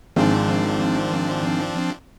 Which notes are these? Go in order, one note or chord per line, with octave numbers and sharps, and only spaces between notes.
G#1 F3 G#3 C4 D4